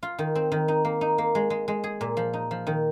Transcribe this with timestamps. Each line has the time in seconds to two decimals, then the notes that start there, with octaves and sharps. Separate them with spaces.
0.03 F4
0.19 D#3
0.35 C4
0.52 D#3
0.68 D#4
0.85 A#3
1.01 D#4
1.18 A#3
1.35 G#3
1.50 G#3
1.68 G#3
1.84 G#4
2.01 A#2
2.17 F3
2.33 D#4
2.51 F3
2.67 D#3